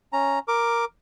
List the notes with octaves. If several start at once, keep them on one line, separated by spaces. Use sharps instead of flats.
C#4 A#5
A#4 D6